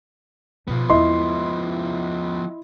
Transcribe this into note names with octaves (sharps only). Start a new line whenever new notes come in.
B2 F3 B3
E2 G#3 E4 D#5 C6